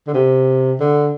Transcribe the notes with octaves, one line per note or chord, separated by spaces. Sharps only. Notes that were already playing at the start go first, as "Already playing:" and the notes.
D3
C3
D3